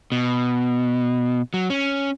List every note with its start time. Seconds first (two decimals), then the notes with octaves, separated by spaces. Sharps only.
0.12 B2
1.54 F#3
1.70 C#4